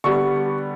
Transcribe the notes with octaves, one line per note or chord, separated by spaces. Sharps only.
D3 G3 B3 C#6